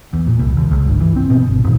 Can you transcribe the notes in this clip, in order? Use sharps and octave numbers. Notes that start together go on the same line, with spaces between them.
E2
A#2
C2
D#2
C#2
G1
E3
C4
B2
G1
D#1